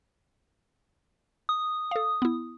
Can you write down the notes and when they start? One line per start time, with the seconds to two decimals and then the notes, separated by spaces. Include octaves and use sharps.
1.49 D#6
1.91 A4 F5
2.22 B3 E4